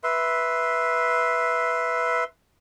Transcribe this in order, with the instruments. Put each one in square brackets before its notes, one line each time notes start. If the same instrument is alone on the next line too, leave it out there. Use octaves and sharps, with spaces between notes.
[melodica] B4 E5 C6